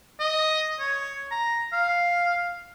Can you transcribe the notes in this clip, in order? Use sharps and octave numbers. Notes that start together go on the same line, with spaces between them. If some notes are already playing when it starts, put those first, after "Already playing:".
D#5
C#5
A#5
F5